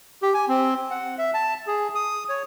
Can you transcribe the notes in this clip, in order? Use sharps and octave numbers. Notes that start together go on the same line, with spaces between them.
G4
G#5
C4
F#5
E5
A5
G#4
D#6
C#5